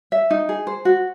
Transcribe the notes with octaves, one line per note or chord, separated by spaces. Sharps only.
E5
D#4
G#4
C5
F#4